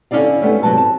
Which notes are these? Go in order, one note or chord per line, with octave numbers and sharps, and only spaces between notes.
D3 C#4 E4 D5 F5
G3 A3 B3 C#4
C3 F#3 B4 A5
A5